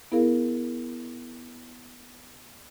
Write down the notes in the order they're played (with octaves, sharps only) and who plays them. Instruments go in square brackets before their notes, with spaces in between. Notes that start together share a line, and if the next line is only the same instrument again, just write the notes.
[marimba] B3 E4 G#4 A#4 F5